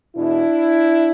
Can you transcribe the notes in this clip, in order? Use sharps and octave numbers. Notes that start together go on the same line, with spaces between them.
E2 B2 D4 E4